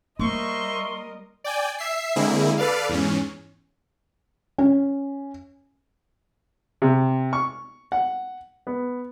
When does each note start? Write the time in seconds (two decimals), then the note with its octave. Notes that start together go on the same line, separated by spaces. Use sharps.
0.19 G3 A#3 A#4 C5 D#5 E5 C6 C#6
1.44 D5 G5 G#5
1.78 E5 C7
2.16 D3 G#3 A#3 C4 E4 G#4
2.58 A4 B4 D5 F5
2.89 E2 G#2 C#4
4.58 C#4
6.82 C3
7.33 C#6
7.92 F#5
8.67 B3